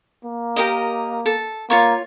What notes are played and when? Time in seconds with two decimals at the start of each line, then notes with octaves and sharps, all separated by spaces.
0.24 A#3
0.56 G4 A#4 D#5
1.26 A4
1.70 A#3 F4 C#5 C#6